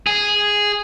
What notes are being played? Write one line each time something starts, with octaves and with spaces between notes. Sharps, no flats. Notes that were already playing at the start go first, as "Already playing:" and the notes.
G#4